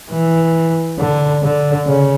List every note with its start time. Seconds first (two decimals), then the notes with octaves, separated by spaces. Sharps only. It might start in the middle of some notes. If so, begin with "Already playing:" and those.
0.11 E3
0.99 D3
1.43 D3
1.87 C#3